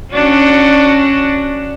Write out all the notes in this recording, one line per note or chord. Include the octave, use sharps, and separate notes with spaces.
C#4 D4 F#4